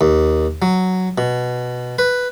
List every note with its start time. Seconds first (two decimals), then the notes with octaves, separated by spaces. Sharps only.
0.01 D#2
0.62 F#3
1.18 B2
1.99 B4